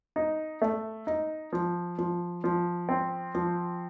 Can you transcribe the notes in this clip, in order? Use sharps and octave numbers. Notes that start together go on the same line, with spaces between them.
D#4
A3
D#4
F3
F3
F3
C4
F3